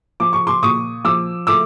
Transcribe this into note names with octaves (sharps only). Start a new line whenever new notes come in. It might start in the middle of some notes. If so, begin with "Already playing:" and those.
F3 D6
C#6
C6 D6
A#2 C#6 D#6
F3 D6 E6
A3 D6 E6